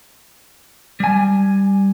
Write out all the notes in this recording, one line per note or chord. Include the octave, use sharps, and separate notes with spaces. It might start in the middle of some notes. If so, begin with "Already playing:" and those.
G3 G#5